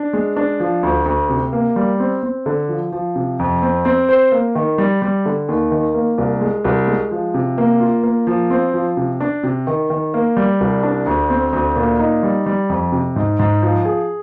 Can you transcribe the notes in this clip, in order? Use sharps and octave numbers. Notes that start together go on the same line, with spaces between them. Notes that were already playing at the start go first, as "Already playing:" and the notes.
Already playing: D4
G#3
D4
F3
D2
D2
C3
A#3
G3
C4
C4
D3
F3
F3
C3
F2
C4
C4
C5
A#3
D#3
G3
G3
D3
D#2
D#3
A#3
C2
G#3
C2
G#3
F3
C3
A#3
F4
A#3
F3
C4
F3
C3
D4
C3
D#3
D#3
A#3
G3
C2
D4
D2
C4
D2
A#2
D#4
G3
G3
F2
C3
G#2
G#2
F3
G#4